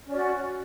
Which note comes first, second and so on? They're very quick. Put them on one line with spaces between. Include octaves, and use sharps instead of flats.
C#4 D5 F#4